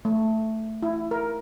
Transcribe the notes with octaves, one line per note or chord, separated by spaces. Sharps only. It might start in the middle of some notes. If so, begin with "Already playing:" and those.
A3
E4
A#4